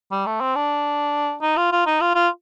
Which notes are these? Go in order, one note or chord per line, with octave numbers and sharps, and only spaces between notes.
G3
A3
C4
D4
D#4
F4
F4
D#4
F4
F4